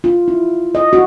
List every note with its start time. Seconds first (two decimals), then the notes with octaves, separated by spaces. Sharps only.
0.04 F4
0.28 E4
0.75 D#5
0.93 F#4